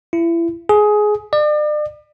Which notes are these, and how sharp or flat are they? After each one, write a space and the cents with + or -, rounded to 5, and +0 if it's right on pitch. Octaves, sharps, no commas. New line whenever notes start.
E4 +30
G#4 +15
D5 +40